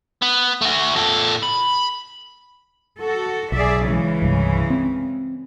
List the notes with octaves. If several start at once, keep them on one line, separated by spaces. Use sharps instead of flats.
B3
A3 F#4
A#2 A4
B5
F#4 A4
B1 G#4 D5 E5
C#3 E3 G#3
C2 G2
C4